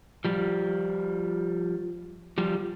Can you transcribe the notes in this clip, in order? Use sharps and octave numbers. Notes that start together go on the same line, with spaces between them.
F3 G3
F3 G3